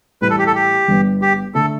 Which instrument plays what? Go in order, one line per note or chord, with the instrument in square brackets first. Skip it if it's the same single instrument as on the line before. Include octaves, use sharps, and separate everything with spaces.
[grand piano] A2 E3 G3 [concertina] B4
[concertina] A4
G4
A4
G4
[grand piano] G1 G2 G3 B3
[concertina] G4
[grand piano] D3 A3 [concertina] A4